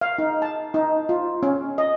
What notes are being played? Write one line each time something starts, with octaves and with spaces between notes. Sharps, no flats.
F5
D#4
A5
D#4
F4
C#4
D#5